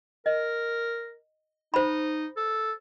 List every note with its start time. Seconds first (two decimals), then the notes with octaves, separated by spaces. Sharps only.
0.26 A#4 D#5
1.74 D#4 C5 B5
2.36 A4